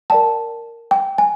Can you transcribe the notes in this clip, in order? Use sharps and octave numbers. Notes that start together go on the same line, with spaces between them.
A#4 D5 G5 A5
G5
G#5